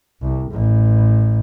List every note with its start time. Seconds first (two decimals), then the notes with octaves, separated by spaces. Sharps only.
0.21 C2
0.51 A1